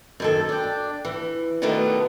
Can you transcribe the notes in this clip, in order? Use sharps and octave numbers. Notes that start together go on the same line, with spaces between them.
F#2 D#3 A4
D4 G5
E3
B2 D3 D#3 A3 B3